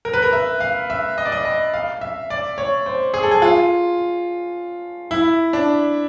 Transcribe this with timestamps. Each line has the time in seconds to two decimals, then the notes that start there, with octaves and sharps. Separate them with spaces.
0.05 A#4
0.13 B4
0.22 A#4
0.33 E5
0.60 F5
0.90 E5
1.18 D#5
1.25 D5
1.32 D#5
1.45 D#5
1.74 F5
2.01 E5
2.30 D5
2.58 C#5
2.86 C5
3.14 G#4
3.23 A4
3.31 G#4
3.42 F4
5.11 E4
5.53 D4